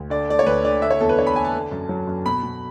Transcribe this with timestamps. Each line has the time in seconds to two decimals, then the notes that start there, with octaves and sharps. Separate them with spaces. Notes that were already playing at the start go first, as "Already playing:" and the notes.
Already playing: D2
0.10 D3 D5
0.29 A3 D5
0.39 C#5
0.46 D2 B4
0.64 D3 D5
0.82 D3 E5
0.91 C#5
1.00 E2 A4
1.09 B4
1.18 D4 C#5
1.27 B5
1.36 D4 G#5
1.45 A5
1.54 D3
1.71 F#2
1.89 F#3
2.07 F#2
2.25 B2 B5
2.43 B2